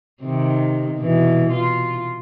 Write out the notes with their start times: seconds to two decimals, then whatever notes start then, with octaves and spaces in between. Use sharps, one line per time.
0.23 C3 D#3
0.99 B2 E3
1.51 F4